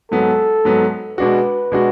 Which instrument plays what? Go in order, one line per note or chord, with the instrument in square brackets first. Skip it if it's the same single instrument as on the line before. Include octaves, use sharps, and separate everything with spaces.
[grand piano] G#2 F#3 B3 [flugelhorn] A4
[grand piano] G#2 F#3 B3
[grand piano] B2 G#3 D4 F#4 [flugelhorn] B4
[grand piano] B2 G#3 D4 F#4